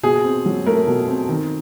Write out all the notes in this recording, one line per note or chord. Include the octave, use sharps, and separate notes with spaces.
B2 G#4
C4
F#3
A3 A#4
B2
C4
D#3